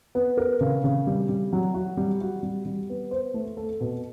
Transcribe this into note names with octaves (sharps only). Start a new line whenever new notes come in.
B3
A#4
C#3
C#3
G3
G3
F#3
F#4
G3
F#4
G3
G3
B3
C5
A3
A4
B2